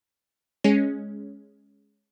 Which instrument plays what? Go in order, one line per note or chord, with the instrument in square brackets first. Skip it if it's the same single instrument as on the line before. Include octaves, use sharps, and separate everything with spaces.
[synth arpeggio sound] G#3 C#4